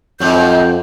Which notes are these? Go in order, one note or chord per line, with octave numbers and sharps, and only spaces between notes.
F2 G#2 F#3 G6